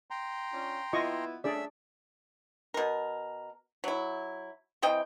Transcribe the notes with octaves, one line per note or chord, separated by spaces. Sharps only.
G5 A#5 C6
C#4 D4 F4
B3 E4 F4 D#5 C#6
A3 C#4 D4 G#4 D5 E5 E6
B2 A#4
F#3 E4
C3 E3 D#5 G5